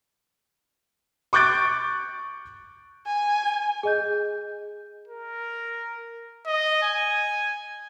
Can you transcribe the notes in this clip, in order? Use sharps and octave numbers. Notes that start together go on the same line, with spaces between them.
C#6 D6 F#6 G6 A6 D7
G#5
G#4 D#5 G6
A#4
D#5
G#5